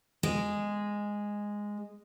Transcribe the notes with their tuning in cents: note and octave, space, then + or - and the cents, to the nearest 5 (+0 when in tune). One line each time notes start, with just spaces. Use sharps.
G#3 -10